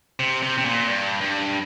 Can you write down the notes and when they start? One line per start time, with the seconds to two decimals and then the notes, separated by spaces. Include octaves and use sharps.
0.20 C3
0.43 C3
0.58 C3
0.65 A#2
0.88 G2
1.21 G2